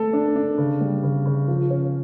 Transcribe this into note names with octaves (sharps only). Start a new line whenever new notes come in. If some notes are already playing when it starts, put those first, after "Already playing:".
Already playing: A3 A4
D4
D4
C#3
G3
C#3
C#3
F3
C#4